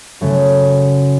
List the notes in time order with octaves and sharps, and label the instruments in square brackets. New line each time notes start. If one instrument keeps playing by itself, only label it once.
[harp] F#2 C#3 F#3 A3